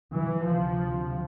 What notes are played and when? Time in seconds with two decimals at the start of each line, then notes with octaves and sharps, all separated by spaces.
0.16 E3
0.47 D2 C3 F3